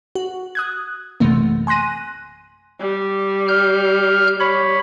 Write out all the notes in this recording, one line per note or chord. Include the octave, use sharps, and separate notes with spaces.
F#4
D#6 F#6 G#6
A#1 F#2 C3 E3 A3 A#3
G#5 C6 F#6 A#6 D#7
G3
F6 G6
G3 C#5 B5